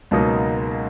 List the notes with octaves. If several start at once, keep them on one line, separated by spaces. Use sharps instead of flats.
C#2 B2 F#3 A#3 D#4